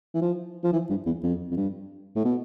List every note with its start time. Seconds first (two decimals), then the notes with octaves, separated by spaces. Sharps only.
0.15 E3
0.22 F3
0.64 F3
0.73 E3
0.90 G2
1.06 E2
1.23 F2
1.51 F2
1.57 G2
2.16 A2
2.25 B2